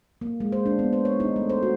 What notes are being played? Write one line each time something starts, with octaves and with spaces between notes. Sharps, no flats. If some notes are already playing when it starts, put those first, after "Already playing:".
A#3
G#3
C5
D4
B3
C5
C#5
D#4
A3
C5
F#4